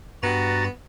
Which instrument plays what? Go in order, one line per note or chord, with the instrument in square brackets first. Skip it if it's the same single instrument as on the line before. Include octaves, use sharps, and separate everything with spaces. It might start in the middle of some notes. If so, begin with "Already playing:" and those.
[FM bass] G2 [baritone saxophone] B3 [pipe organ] F#4 A#5 A6